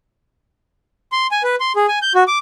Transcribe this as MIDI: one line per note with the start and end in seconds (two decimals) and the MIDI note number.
1.12 1.27 84
1.31 1.42 80
1.43 1.55 71
1.60 1.72 84
1.76 1.86 68
1.88 1.99 80
2.02 2.13 91
2.15 2.24 66
2.28 2.39 86